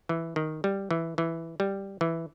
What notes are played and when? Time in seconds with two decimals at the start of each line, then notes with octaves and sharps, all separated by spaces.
0.09 E3
0.36 D#3
0.64 G3
0.91 E3
1.18 E3
1.60 G3
2.01 E3